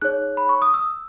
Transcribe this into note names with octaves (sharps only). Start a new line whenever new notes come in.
D#4 G#4 C#5 F#6
B5
C#6
D#6
E6